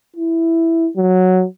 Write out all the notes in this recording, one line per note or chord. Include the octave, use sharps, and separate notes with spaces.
E4
F#3